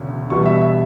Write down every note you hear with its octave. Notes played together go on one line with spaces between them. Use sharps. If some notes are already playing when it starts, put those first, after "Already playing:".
Already playing: E1 D2 C#3
E1 E2 B2 G3 C#6
E5
E5